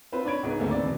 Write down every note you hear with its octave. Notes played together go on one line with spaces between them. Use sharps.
C4 F4 B4 C5
D4 C#5 B5 G#6 D7
C#2 G#2 B3
D2 G#2 D3 A3 A#3 C4
B3 C4 D5
E2 B2